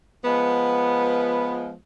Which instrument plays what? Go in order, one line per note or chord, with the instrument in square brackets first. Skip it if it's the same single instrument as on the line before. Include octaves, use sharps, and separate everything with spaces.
[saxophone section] F3 G#3 B3